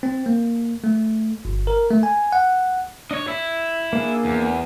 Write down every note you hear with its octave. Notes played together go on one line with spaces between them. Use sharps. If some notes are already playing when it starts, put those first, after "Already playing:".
C4
A#3
A3
G1
A#4
A3
G#5
F#5
D4 C#5 D#5
E4 E5
A#3 D4 G#4
E2